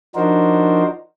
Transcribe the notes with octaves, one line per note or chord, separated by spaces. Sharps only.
F3 D4 D#4 F#4 A#4 C5